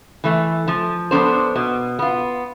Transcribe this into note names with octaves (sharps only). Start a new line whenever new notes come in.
E3 A3
F3
B3 D4 A4 C5
B2
B3 F4